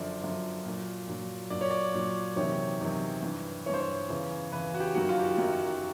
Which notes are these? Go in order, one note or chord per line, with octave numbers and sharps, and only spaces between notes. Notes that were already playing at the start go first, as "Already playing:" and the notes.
Already playing: F#2 D3 F3 D5
F#2 D3 F3
A#2 F#3
A#2 F#3
A#2 F#3 D5
C#5
D5
A#2 F#3
E2 C3 D#3 F#3 C#5
E2 C3 D#3 F#3
G2 E3
G2 E3 C5 C#5
C#5
E2 C#3 E3
E2 C#3 E3 B4
F#4
G4
F#2 D#3 F#3 F#4
F4
G4
F#4
F#2 D#3 F#3 F#4
F#4
F#4